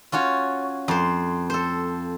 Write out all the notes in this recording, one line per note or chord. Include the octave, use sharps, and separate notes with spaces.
C#4 F4 F#4 C#5
F2 C5
A4 C5